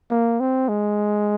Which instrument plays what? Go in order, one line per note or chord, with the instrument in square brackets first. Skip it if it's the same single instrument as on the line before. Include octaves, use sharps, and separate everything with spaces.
[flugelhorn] A#3
C4
G#3